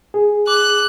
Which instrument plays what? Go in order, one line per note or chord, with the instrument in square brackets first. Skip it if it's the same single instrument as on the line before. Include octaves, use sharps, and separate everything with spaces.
[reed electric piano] G#4
[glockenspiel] D6 [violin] F#6